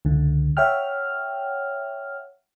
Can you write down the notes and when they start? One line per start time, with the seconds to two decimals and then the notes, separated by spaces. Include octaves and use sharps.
0.05 C#2 D3
0.57 C#5 E5 F#5 G5 F6